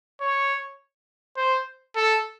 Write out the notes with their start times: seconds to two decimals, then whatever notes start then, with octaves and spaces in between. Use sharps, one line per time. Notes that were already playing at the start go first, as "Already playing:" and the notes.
0.21 C#5
1.37 C5
1.96 A4